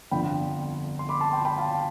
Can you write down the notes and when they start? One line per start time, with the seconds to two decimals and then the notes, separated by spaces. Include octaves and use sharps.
0.11 G1 F2 D3 F3 G5 B5
0.99 C6
1.09 B5 D6
1.21 A5 C6
1.33 G5 B5
1.45 G5 B5
1.57 F5 A5